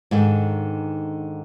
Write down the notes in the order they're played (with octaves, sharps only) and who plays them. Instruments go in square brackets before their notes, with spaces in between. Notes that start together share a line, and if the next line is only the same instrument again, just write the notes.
[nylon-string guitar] G#2 D3 D#3